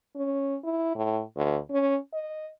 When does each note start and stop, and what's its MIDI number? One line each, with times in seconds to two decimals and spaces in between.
0.15 0.56 61
0.64 0.95 64
0.95 1.22 45
1.36 1.58 38
1.71 1.97 61
2.14 2.48 75